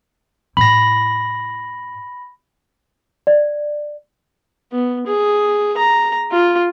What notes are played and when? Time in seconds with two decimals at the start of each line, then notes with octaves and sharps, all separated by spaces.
0.57 A2 E4 B5 A#6
3.27 D5
4.73 B3
5.07 G#4
5.77 A#5
6.31 F4